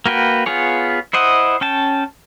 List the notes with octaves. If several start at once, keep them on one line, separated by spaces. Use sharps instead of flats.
A#3 F#4 B4 G5
B3 F4 G#4 C#5
E4 C5 D#5 F#5
C#4 G5 A5